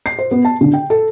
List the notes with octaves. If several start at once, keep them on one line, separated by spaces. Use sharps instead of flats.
C7
C5
B3
A5
D3
G5
A4